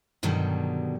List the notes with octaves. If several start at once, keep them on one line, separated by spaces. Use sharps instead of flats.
G2 B2 D3 D#3 F#3 G3